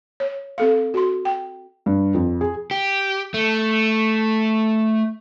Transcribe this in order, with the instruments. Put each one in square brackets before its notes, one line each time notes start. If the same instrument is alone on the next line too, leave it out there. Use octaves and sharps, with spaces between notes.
[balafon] C#5
C4 A4 F5
F#4 C6
G5
[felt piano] G2
F2
G#4
[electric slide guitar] G4
A3